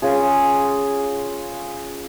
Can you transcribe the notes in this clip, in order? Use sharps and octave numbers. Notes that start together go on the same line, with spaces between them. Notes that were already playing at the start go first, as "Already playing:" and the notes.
C#4 F4 G#4